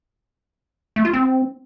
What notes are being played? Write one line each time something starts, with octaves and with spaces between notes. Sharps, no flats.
A3
F4
C4